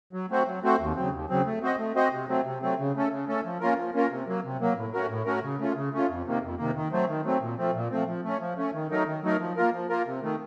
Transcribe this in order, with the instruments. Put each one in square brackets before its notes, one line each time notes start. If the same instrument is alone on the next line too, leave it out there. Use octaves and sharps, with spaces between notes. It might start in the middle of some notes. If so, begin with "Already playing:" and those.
[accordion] F#3
A3 C4 F#4 C5
F#3
A3 C4 F#4 C5
D#2
C#3 F#3 C4
D#2
C#3 F#3 C4
A3
C4 F#4 C5 D#5
A3
C4 F#4 C5 D#5
C3
F#3 A3 C4
C3
F#3 A3 C4
C#3
A3 C#4 A4
C#3
A3 C#4 A4
F3
A#3 C#4 F4 A#4
F3
A#3 C#4 F4 A#4
C3
F#3 A#3
C3
F#3 A#3
A2
A3 C#4 F#4 A#4
A2
A3 C#4 F#4 A#4
C#3
A3 C#4 F4
C#3
A3 C#4 F4
F2
C3 D#3 A#3
F2
C3 D#3 A#3
D#3
F#3 A3 C4
D#3
F#3 A3 C4
A#2
F3 A3 C4
A#2
F3 A3 C4
F3
A3 C#4
F3
A3 C#4
D#3
F#3 A3 D#4 A#4
D#3
F#3 A3 D#4 A#4
F3
A#3 F4 A#4
F3
A#3 F4 A#4
C3
D#3 A3